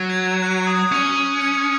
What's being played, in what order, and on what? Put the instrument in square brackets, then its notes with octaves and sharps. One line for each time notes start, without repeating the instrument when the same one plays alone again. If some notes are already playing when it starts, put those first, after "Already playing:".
Already playing: [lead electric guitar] F#3
[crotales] G#6
G#6
F#6
F#6
D#6
D#6
[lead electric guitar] C#4 [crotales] G#6
[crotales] G#6 C#7